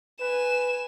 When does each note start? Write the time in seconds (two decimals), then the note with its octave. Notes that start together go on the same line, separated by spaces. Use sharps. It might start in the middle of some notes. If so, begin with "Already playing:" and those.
0.20 B4 G#5 E7